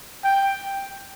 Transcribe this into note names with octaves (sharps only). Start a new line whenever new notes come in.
G5